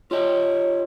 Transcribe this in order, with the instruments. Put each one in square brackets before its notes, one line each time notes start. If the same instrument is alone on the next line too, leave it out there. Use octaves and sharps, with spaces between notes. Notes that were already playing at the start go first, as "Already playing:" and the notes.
[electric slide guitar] F4 G4 D#5 [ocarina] C#5